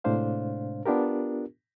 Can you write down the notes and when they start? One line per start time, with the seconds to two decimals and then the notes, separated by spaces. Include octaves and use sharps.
0.04 A2 C3 G#3 D4 C5 F5
0.86 B3 D4 F4 G4 A#4